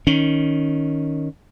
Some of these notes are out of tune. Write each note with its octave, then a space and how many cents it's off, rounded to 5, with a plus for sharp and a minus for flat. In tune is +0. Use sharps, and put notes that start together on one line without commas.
D#3 +0 C#4 +0